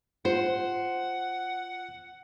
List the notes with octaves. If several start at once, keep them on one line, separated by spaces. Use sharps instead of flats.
F4 C5 F#5